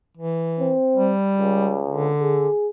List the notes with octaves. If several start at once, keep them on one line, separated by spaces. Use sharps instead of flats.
E3
C4
G3
C#2
D3
G#4